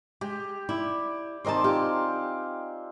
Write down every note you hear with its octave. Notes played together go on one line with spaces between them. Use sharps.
G#3 G4
E4 D5
D#3 C4 C5 D5 D#5 A5
F4 G4 G#5